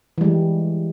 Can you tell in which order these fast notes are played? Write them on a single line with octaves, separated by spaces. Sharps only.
E3 G3 G#3